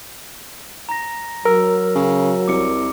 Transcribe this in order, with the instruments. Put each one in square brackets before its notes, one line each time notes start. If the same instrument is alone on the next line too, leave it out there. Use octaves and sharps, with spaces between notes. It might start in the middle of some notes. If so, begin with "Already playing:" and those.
[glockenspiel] A#5 A#6
[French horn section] F#3 [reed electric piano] A#4 [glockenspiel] E6
[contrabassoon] C#3
[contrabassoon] C2 [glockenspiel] D6 C#7